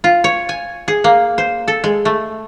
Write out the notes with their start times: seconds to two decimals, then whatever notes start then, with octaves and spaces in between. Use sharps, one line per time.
0.04 F4
0.24 C#5
0.49 G#5
0.88 G#4
1.04 A#3
1.38 C5
1.68 A4
1.84 G#3
2.05 A3